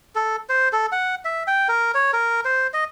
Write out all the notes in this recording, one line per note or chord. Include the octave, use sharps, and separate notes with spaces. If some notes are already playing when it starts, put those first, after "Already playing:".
A4
C5
A4
F#5
E5
G5
A#4
C#5
A#4
C5
D#5